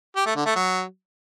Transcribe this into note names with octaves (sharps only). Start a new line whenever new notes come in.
G4
A3
D3
A3
F#3